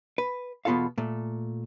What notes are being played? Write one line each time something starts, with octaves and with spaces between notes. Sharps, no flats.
B4
E2 B2 B3 F4 A4 F5
A#2 A3